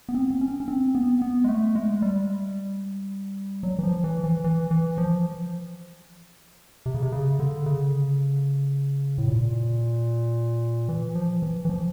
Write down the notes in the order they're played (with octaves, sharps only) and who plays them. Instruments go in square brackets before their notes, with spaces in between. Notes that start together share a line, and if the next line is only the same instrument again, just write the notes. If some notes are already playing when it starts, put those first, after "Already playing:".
[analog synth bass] B3
C4
C4
C#4
C#4
C4
B3
B3
G#3
A3
G#3
G3
F#3
E3
F3
E3
E3
E3
E3
F3
C3
C#3
C3
C#3
D3
C#3
A2
A#2
E3
F3
E3
E3
F3